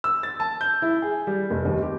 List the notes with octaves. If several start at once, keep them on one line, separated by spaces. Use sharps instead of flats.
E6
A6
A5
G6
E4
G#4
G3
F1
D#2
G4